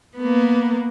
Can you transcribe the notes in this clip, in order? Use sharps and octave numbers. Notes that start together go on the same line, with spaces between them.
A#3 B3